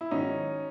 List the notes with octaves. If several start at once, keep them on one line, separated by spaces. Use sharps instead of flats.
E4
G#2 D#3 F#3 C#4 D#4